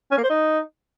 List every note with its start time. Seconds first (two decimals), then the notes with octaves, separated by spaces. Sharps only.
0.11 C#4
0.17 A#3
0.24 C5
0.30 D#4